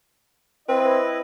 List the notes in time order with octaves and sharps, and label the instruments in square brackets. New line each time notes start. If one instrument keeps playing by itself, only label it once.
[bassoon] C4 [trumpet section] E4 D#5 [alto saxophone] B4